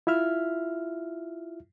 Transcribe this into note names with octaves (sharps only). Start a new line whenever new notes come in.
E4 F4 E5 F6